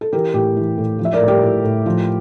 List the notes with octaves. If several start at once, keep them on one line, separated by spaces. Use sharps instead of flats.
A4
E3 G4 A#4
A2 G4 A#4
E3
A2
F3
E5
A#4 D5
A2
G4 A#4
A2
A2
F3